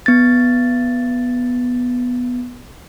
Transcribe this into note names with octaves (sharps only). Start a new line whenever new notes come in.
B3 A6